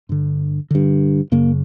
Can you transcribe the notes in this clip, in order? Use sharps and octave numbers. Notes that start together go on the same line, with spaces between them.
G2 D3
G2 D3
F#2 C#3 A#3